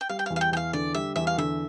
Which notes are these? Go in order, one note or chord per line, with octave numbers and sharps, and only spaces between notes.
G5
G3 F5
G5
F5
E2
F5
G5
E2 F5 G5
D3 D5
G3 E5
E2 E5
F5
D3 E5